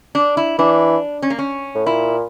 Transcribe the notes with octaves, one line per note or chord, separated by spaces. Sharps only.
D4
E4
E3 D4
C#4
A#3
C#4
A2
A#2 E4